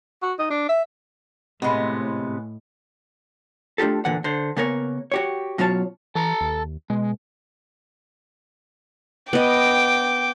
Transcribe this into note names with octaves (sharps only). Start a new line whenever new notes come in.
F#4
D#4
D4
E5
A2 C3 G#3 B3 D#5 B5
A3 D4 F4 G4 A4
A#2 D3 E3 F#5
D3 C5
C#3 A#3 B3 A#4 C#5
F#4 G4 C#5
B2 F#3 C#4 F4 C#5 A5
E3 A4 A5 A#5
D#2
B2 G#3
B3 D#5 G5 D6